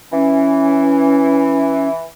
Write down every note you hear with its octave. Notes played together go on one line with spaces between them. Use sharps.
E3 C#4